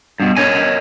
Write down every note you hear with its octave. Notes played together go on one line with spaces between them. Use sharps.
G2 B2
A#4 C#5 D#5 G#5